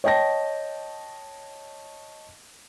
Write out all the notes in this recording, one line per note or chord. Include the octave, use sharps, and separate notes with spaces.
C#5 D#5 G5 A5 A#6